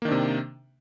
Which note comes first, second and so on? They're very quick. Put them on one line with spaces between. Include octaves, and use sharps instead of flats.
A#3 D#3 D4 C3